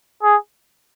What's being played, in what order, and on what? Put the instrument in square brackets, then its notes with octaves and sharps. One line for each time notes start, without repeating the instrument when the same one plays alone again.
[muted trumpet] G#4